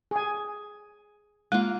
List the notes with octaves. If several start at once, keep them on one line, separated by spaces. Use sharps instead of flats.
G#4 G#5
G#3 A#3 F4